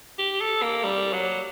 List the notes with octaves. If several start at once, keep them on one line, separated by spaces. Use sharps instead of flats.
G4
A4
A#3
G3
F#3